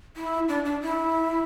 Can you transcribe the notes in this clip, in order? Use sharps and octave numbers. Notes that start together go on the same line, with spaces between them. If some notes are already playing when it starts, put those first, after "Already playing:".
E4
D4
D4
E4